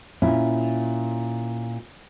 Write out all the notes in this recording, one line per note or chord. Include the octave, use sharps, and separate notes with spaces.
A#2 C#4 E4